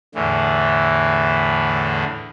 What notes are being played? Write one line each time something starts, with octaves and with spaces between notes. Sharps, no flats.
E2 A2 D3 E3